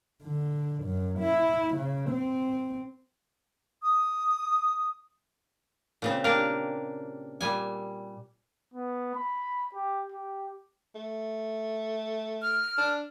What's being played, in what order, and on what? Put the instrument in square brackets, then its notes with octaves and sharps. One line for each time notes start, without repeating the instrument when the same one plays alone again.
[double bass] D3
F#2
E4
C#3
C4
[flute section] D#6
[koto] A#2 C#3 C4
[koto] A#3 G4 [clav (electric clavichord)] D4 A#4 F5
[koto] A#2 G3 G#5
[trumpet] B3
B5
G4
G4
[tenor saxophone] A3
[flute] F6
[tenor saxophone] D4